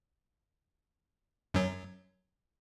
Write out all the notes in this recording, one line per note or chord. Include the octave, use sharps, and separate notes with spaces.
F#2 F#3